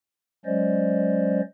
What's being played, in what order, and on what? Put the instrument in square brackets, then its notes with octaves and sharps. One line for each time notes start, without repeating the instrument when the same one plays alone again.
[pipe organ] F#3 G#3 C#4 C5 D5 D#5